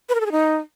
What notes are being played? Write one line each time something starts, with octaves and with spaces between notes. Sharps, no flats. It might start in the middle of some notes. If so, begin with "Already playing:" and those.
B4
A#4
A4
G#4
D#4